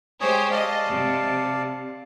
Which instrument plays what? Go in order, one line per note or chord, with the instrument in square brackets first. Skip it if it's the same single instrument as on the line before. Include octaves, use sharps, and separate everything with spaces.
[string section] G#3 G4 C5 [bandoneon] C#5 G#5 D#6
[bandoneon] D5 F5 A5 [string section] D#5
[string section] C3